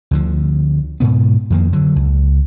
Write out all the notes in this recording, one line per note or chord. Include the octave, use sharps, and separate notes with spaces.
D2 D3 F3
G#2 B2 B3
F2 D#3 A3 A#3
D3 F#3
C#2